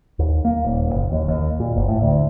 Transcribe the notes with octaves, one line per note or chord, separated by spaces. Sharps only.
D#2
A#3
D#1
F#1
D#2
D#2
A#2
F#1
A2
D2